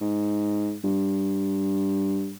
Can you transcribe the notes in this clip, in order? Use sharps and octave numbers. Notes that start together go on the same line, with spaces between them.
G#2
G2